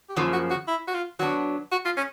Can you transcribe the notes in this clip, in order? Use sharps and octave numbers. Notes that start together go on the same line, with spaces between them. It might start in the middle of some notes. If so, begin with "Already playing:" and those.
G4
F#2 C#3 F3 A#3 F#4
F#4
F#4
E4
F#4
F4
F#3 B3 D4 F#4
F#4
F4
C#4